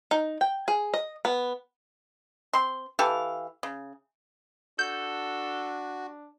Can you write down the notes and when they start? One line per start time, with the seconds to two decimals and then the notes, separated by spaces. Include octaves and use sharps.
0.11 D#4
0.41 G5
0.68 G#4
0.94 D#5
1.25 B3
2.53 C4 C6
2.99 E3 G4 A4 F5
3.63 C#3
4.79 D4 F#4 A4 G6